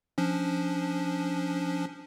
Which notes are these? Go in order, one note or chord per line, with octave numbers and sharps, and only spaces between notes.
F3 C#4 D4